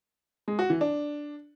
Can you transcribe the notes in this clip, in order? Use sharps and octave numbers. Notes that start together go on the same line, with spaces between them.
G#3
F#4
E3
D4